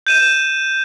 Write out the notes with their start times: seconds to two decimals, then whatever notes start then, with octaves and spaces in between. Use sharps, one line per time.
0.07 G6 D#7 E7